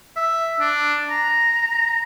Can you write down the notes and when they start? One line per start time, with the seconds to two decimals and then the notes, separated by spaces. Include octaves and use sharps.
0.17 E5
0.60 D4
1.10 A#5